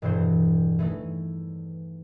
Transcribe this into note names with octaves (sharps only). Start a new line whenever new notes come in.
E1 G2 E3 C5
E3 A3 D#4